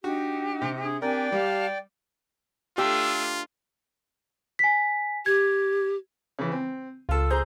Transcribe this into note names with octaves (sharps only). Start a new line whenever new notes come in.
D4 D#4 F#4 G4
C3
D4 G#4
C4 D4 G4 A#4 D5 G5 G#5
G3 G4 F5 A5
A3 D4 F4 G4 E6
G#5 B6
G4 G#6
C#3 E3
C4
C#2 F4 A4 E6
G#4 C5 A#5 G6